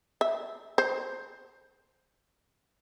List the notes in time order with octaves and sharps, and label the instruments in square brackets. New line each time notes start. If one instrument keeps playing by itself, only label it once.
[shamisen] E5
C5